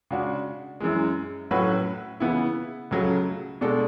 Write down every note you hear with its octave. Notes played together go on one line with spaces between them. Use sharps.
C#3 G#3 D4 F#4
F#2 E3 G#3
A2 F#3 C#4 F#4 B4
C#3 E3 B3 E4
C#2 C#3 F#3 A3
B2 G#3 D4 A4